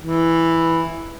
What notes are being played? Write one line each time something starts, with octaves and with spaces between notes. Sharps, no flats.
E3